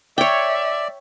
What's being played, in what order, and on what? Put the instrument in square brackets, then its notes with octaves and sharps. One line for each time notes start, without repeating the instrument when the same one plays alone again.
[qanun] C#5 G5 [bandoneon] D5 [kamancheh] E5